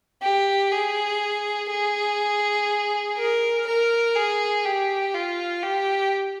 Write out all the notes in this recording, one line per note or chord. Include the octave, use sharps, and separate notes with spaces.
G4
G#4
G#4
A#4
A#4
G#4
G4
F4
G4